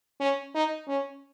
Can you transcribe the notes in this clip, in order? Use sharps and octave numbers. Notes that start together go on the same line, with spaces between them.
C#4
D#4
C#4